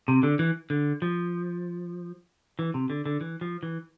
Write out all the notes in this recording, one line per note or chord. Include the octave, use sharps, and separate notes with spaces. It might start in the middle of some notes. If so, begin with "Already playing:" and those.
C3
D3
E3
D3
F3
E3
C3
D3
D3
E3
F3
E3